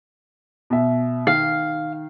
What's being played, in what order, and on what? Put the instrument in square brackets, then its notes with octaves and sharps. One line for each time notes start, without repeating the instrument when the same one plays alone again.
[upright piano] B2 E5
[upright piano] D#3 [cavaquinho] F5